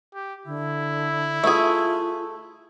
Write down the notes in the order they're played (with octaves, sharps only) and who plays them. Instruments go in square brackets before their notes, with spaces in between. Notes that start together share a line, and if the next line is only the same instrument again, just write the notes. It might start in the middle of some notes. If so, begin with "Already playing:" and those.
[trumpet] G4
[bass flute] D3 [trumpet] E4
[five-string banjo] A3 G#4 [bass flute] F4